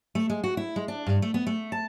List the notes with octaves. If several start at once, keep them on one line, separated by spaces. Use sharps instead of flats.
A3
G#3
F#4
E4
G#3
D4
G2
A3
B3
A3
A5